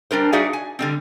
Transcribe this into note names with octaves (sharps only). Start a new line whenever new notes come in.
G3 D4 A#4 C5
D#4 F#4 G#4 D5 E5 F5
G#5
D3 G3 C4